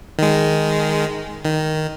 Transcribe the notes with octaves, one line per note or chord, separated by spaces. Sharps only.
D#3 G#3
D#3